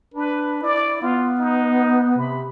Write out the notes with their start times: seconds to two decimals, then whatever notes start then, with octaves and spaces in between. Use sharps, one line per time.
0.14 D4 B4
0.63 E4 D5
1.02 B3 F4
1.40 D#4
2.17 C3 B5